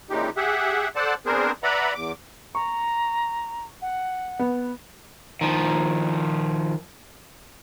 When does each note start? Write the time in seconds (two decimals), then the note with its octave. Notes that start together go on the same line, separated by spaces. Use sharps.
0.10 A#2 C#3 E3 G#3 D#4 G4
0.36 G4 G#4 E5 F#5
0.96 A4 C5 D5 F#5 A5
1.26 B3 C4 D4 G#4 A#4 C5
1.63 B4 D5 E5 F#5 A#5 B5
1.95 E2 D6
2.55 A#5 C#6
3.82 F#5
4.39 B3
5.41 D#3 F3